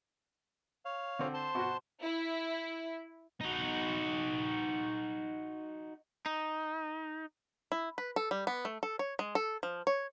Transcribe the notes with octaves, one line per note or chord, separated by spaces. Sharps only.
C#5 F5
D3 C4
C5 A5 C6
B2 F#4
E4
D#4 F#4
D#4
E4
B4
A4
G3
B3
A3
A4
C#5
G#3
A4
F3
C#5